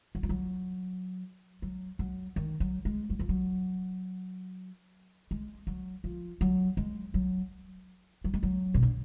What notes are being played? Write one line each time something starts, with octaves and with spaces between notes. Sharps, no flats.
F#3
F3
F#3
F#3
F#3
D#3
F#3
G#3
F#3
F3
F#3
G#3
F#3
F3
F#3
G#3
F#3
F#3
G#3
F#3
B2
D3